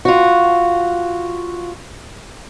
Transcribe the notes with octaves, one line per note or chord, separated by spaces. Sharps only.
F4 F#4